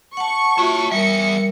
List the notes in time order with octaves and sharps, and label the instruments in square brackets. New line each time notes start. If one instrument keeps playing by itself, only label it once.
[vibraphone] F#5 A5 [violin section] C#6
[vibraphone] F4 F#4 E5 [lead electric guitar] C#5 A5
[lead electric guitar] E2 E5 [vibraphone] G3 A#4 [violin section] C#7